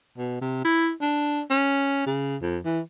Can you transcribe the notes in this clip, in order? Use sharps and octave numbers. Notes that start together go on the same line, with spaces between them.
B2
C3
E4
D4
C#4
C#3
F2
E3